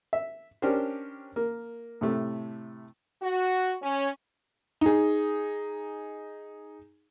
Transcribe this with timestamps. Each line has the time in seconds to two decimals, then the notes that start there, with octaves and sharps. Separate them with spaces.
0.13 E5
0.62 C#4 D4 G4 A#4 C5
1.36 A#3
2.01 A2 C3 A3
3.22 F#4
3.83 C#4
4.81 D#4 G#4